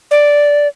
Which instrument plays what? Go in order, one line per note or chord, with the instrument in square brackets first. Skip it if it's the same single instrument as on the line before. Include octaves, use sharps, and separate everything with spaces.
[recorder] D5